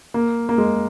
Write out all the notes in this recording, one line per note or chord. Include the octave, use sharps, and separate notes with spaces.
A#3
A#3
G#3